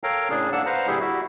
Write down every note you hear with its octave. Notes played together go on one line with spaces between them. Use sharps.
A4 A#4 C#5 F5 G5 A#5
A2 C#3 D4 G#4
G#2 A#3 D4 F#5 E6
B4 C5 F5 F#5 A#5
A#2 D3 G3 E4 G4 G#4
G3 E4 F#4